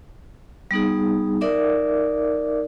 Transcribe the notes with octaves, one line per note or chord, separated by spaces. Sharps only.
G3 B3 D#4 G#4
D#4 A#4 D5 E5 D6